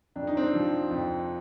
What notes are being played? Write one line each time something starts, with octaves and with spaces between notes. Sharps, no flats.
F2 D4
D#4
C4 D4
C3 F3
F2